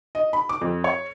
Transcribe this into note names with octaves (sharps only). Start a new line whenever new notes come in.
D#5
B5
D6
F2
C#5